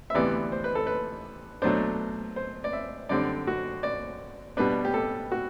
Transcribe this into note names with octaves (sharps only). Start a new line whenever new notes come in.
E5
D2 C3 E3 B3 D5
C5
B4
A4
B4
B2 F#3 A3 D4 C5
C5
D5
E5
F#2 D3 G3 C4 D5
F#4
D5
B2 G3 D4 B4
G4
A4
F#4